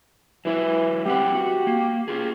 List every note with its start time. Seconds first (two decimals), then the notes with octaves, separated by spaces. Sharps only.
0.45 E3 F#3 E4 B4
1.06 G3 C4 G4 F#5
1.35 F#4
1.67 A#3
2.08 F4 G#4